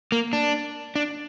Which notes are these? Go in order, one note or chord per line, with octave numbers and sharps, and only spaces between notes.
A#3
D4
D4